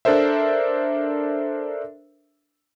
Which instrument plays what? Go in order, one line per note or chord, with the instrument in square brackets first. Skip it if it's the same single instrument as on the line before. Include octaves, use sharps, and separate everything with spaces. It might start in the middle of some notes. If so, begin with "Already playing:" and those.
[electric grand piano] D4 A4 A#4 C5 E5